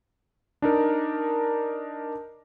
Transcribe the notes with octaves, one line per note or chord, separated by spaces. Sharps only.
D4 D#4 A#4